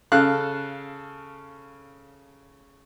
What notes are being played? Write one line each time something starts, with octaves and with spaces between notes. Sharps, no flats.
C#3 A4 F5 F#6